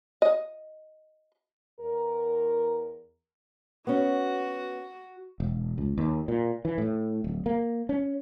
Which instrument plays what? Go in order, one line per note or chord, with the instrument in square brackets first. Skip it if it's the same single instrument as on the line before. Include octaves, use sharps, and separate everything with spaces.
[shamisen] D#5
[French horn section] E2 A#4
[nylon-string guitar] B3 C#4 [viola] F#4
[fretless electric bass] E1
C#2
D#2
A#2
E3
A2
D1
A#3
C#4